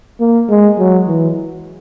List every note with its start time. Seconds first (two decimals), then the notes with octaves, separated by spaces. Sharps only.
0.20 A#3
0.49 G#3
0.78 F#3
1.08 E3